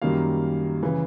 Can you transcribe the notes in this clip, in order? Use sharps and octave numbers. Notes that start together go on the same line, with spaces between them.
F#2 D#3 G3 A#3 F5
C#3 E3